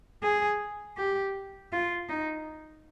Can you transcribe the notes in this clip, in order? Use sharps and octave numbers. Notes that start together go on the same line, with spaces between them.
G#4
G4
F4
D#4